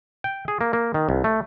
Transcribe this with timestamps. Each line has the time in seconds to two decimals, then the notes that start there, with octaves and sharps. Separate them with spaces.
0.24 G5
0.48 G#4
0.61 A#3
0.73 A#3
0.94 D#3
1.09 C2
1.24 A3